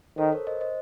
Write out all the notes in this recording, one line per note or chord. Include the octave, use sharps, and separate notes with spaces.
D#3 A4 C5
A#4 C#5
C5 D#5
C5 D#5